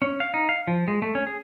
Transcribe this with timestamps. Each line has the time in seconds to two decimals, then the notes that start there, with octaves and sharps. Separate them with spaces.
0.02 C#4
0.20 F5
0.34 D#4
0.49 F5
0.67 F3
0.88 G#3
1.02 A3
1.15 C#4
1.27 G#4